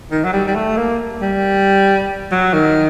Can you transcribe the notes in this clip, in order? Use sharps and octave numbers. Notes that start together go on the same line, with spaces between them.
D#3
F#3
G3
G3
A3
A#3
G3
F#3
D#3